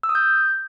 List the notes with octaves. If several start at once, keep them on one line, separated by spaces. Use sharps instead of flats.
E6
D#6
G6